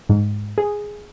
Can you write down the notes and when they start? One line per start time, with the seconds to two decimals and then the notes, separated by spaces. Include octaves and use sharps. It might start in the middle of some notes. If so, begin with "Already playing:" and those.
0.09 G#2
0.58 G#4